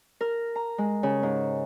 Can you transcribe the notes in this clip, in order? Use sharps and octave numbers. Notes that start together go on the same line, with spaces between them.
A#4
A#5
G#3
C#3
G#2